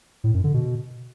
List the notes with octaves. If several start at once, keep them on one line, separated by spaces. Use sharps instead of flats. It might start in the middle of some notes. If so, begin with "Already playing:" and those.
A2
F#2
D3
B2